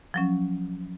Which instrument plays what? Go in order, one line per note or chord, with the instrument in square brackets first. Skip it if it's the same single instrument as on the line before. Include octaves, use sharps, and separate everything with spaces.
[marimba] F3 F#3 C#4